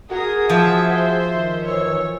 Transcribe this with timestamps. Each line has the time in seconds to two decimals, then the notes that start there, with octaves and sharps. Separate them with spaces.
0.11 F#4 G#4 A#4 D#6
0.49 F3 E5
0.91 C5 E5
1.34 D#3
1.66 F#2 E3 C#5 E6